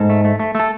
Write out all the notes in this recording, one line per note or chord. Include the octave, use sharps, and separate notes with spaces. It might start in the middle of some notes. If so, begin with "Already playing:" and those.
Already playing: G#2 A4
A3
A3
A3
A3 A4